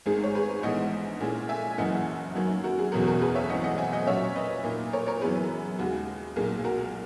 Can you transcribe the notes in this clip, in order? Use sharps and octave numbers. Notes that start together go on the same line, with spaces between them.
G#1 G#2 D#3 G#3 G#4
C#5
G#4 B4
A#1 G#2 E3 B3 D#5 F#5
A#2 G#3 C#4 E4
E5 G#5
F#1 F#2 C#3 E3 A#3 D#5 F#5
F#2 D#3 F#3 A#3 C#4
F#4 A#4
G#4
F#1 E2 B2 F#3 B3 F#4 A#4
F#4 A#4
G#4 B4
C#5 E5
G#1 F#2 E3 B3 D#5 F#5
D#5 F#5
E5 G#5
D#5 F#5
A#2 F#3 C#4 C#5 E5
B4 D#5
A#2 A#3 D#4
A#4 C#5
A#4 C#5
F#2 E3 B3 G#4 B4
D#2 C#3 G#3 F#4
B1 A#2 A#3 D#4 G#4
F#4 A#4